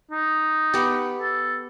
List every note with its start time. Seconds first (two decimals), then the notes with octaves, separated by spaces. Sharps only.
0.11 D#4
0.74 B3 G4
1.22 A4